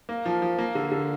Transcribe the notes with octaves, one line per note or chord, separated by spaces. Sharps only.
A#3
F3
F3
A#3
D3
D3